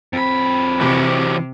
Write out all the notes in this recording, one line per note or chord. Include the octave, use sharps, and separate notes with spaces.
F2 C4 B5
C3 E3 F#4 G4